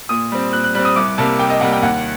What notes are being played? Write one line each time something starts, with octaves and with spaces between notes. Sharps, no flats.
A#2 D#6
G3 C4
A#2 F#6
F#6
G3 C4 F#6
D#6
C2 D6
C3 G3 A#3 A5
C2 G5
D#5
C3 G3 A#3 F#5
G5
D#2 F#5